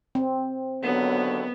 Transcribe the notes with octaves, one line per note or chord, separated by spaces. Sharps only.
C4
D#2 D3 F#3 B3